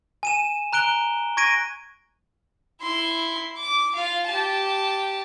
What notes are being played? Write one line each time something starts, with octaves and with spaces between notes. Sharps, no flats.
G#5 D#7 E7
A#5 F#6 D7 G7
C#6 G#6 A#6 D7 D#7
E4 C6
D6
F4 F5
G4 A5